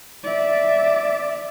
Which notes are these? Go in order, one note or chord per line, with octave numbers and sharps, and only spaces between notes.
D5 E5